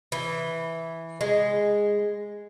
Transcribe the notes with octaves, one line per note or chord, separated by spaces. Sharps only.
E3
G#3